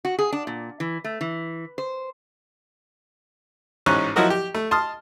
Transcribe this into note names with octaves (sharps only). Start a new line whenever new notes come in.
F#4
G#4
D4
A#2
E3
A3
E3
C5
A1 G#2 C#4 A#5 C#6 F#6
F3 F#3 E4 F#4 A#4 D#5
G4
A3
A5 C6 D#6 F6